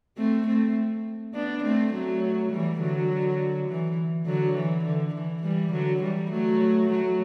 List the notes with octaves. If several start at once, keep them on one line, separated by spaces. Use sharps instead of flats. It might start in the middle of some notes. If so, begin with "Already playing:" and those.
A3 C4
A3 C4
B3 D4
A3 C4
F#3 A3
E3 G3
D3 F#3
E3
D3 F#3
E3
D3
E3
E3 G3
D3 F#3
E3 G3
F#3 A3
F#3 A3